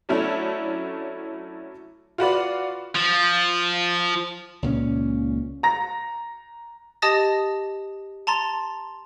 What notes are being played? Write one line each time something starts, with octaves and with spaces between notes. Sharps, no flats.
F#3 A3 C#4 D4 E4 A4
F4 F#4 B4 D5
F3
C#2 A#2 A3 C#4
A#5 A#6
G4 D#5 A5 D#6 A6 A#6
A5 A#5 C6 A6